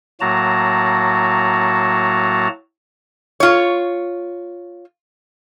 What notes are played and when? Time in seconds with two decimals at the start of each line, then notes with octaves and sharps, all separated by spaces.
0.21 A2 F#3 A#3 F#4 A5 A#5
3.40 F4 C#5